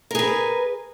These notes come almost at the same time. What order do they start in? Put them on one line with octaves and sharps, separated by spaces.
A#4 G#4 B4